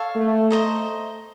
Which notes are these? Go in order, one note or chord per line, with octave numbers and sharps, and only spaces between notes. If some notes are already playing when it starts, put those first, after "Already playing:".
Already playing: A4 C#5 F5
A3
C5 D#5 A#5